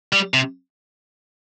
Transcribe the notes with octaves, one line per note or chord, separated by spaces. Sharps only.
G3
C3